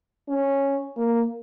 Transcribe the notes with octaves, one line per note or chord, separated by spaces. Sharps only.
C#4
A#3